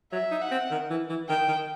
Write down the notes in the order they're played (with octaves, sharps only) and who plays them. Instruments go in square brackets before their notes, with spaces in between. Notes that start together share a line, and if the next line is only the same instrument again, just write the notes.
[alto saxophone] F#3 [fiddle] E5
[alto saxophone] D#4
[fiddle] F#5
[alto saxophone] C4
D#3
E3
E3
[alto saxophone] D#3 [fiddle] G5
[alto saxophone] D#3